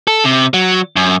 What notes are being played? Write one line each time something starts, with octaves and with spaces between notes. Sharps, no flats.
A4
C3
F#3
F#2